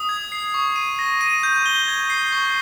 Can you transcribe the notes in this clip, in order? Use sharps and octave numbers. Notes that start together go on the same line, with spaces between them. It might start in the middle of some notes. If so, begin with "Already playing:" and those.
Already playing: D#6
G#6
C7
C#6
D#7
A#6
D#7
G6
G7
G#6
C7
C#6